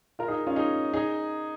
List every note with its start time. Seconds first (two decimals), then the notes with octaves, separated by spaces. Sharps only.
0.19 F4 A#4
0.28 D#4 G#4
0.47 C#4 F4
0.56 D#4 G#4
0.93 D#4 G#4